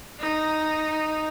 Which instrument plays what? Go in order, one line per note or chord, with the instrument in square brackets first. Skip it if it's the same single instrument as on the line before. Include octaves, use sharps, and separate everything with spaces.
[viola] D#4